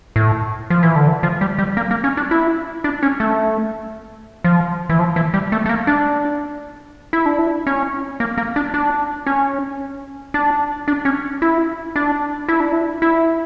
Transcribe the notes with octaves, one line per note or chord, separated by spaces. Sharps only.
A2
F3
E3
D3
E3
F3
G3
G3
A#3
A#3
C#4
D4
E4
D4
C#4
A3
F3
E3
F3
E3
G3
A3
A3
A#3
D4
E4
D4
E4
C#4
A#3
A#3
D4
D4
C#4
D4
D4
C#4
E4
D4
E4
D4
E4
E4